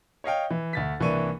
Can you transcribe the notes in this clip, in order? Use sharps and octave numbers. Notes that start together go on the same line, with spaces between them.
C#5 D#5 F5 G5
E3
D2 A6 B6
C2 E3 A#3 D4 C#6 D#7